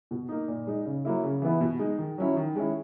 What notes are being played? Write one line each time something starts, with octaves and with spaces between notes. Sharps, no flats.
B2
A#3 D#4
A#2
G#3 D#4
C#3
F#3 A#3 E4
C#3
E3 B3 E4
B2
G#3 D#4
D#3
F#3 C#4 E4
D#3
G#3 C#4 E4